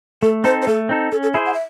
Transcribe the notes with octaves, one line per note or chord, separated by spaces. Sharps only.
A3 A4
C4 D#4 A4 C5
C5
A3 A4
C4 D#4 A4
C#4 A4
A4
E4 G#4 C5 E5
F#5
E5